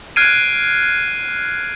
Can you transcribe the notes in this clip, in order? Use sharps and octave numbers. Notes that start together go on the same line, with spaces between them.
F6 F#6 G#6 C7 D7 D#7